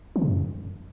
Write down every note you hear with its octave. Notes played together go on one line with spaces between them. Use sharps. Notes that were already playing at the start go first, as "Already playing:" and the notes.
E3
C3
F#2